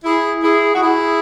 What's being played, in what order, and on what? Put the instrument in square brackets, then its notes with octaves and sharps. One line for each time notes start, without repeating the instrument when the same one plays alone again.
[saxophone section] E4 G#4
E4 G#4
F#4
E4 G#4